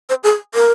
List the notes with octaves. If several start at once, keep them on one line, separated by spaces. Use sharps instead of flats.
C5
G#4
A#4